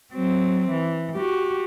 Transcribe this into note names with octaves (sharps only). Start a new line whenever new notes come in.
F#3 C4
E3
F#4 G4